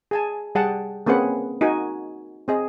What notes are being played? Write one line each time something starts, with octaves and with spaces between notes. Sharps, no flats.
G#4 G#5 A5
G3 G#4 F#5 G5 A5
A#3 C4 C#4 G#4 B4 F#5
D#4 F#4 A#4 G#5
C4 G#4 D#5